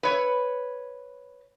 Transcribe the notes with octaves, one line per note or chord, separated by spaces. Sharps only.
B4 C#5